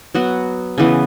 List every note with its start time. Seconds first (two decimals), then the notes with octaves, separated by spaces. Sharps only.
0.15 F#3 B3 F#4
0.78 C#3 E3 B3